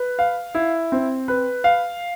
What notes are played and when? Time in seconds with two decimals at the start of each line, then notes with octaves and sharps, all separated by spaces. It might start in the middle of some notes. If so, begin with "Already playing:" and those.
Already playing: B4
0.19 F5
0.55 E4
0.92 C4
1.28 B4
1.64 F5